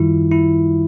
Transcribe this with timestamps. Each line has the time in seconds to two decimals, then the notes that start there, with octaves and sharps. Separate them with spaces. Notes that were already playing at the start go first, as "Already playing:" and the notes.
Already playing: F#2 D#3 G3 E4 F4
0.32 E4